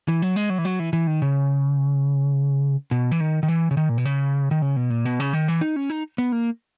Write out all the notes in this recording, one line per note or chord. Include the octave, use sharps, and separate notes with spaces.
E3
F#3
G#3
F#3
E3
F#3
E3
E3
D#3
C#3
B2
E3
D#3
D#3
E3
C#3
D#3
A#2
B2
C#3
D#3
C#3
B2
A#2
B2
C#3
D#3
E3
D#4
C#4
D#4
B3
A#3